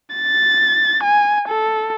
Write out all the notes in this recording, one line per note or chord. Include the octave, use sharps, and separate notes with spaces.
A6
G#5
A4